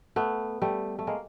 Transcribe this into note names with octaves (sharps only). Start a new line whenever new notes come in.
A3 B3
G3 A3
A3
G#3 A#3